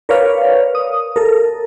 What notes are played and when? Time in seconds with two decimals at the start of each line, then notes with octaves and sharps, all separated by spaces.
0.09 A#4 B4 C#5 D5 F5
0.75 D#6
1.16 A4 A#4